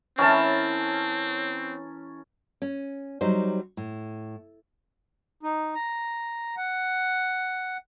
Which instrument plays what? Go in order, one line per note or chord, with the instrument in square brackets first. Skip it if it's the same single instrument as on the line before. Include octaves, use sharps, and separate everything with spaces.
[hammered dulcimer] E3 A#4 C#5 [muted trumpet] C4 [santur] C#4 A5
[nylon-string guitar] C#4
F#3 G3 D#4 C5
A2
[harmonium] D#4
A#5
F#5